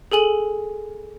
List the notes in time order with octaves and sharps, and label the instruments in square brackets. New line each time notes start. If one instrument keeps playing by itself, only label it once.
[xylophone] G#4 A4 G#5 F#7